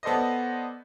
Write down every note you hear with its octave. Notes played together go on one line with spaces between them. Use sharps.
B3 A4 C5 D5 D#5